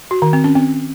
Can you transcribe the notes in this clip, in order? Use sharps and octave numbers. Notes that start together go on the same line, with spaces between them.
F#4
D#3
C4
C#4
C4